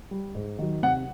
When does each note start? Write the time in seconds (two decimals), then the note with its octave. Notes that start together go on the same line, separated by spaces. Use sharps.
0.11 G3
0.35 G#2
0.59 D#3 F#3
0.83 C3 F#5